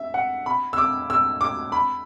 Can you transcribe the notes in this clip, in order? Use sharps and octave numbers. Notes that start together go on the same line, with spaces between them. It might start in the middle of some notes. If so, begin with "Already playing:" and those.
Already playing: E5
F#5
B5
E6
D6
E6
D6
B5